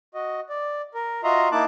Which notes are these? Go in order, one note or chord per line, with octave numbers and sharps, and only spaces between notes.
F#4 D#5
D5
A#4
F4 F#4 D#5 E5 A#5 C6
A#3 D#4 E4 A5 D6 F#6